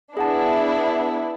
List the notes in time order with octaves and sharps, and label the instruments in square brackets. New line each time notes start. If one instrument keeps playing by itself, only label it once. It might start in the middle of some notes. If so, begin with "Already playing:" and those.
[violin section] B3 D4 E4 [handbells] G#4 F#5 A5